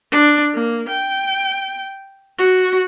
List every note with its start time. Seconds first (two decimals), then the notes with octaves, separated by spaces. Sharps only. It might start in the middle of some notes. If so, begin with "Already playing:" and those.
0.11 D4
0.54 A#3
0.89 G5
2.38 F#4